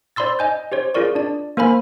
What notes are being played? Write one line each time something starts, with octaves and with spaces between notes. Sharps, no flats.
C5 D5 B5 C6 E6 A6
D#5 G#5 G6
G4 C5 C#5
F4 G#4 A#4 D5 C#6
D4 D5
A#3 A#4 C5 G#5 B5